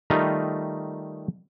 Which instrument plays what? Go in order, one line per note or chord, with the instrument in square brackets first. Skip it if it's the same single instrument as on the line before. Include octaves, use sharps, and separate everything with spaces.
[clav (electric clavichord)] D#3 G3 A3 D#4 F4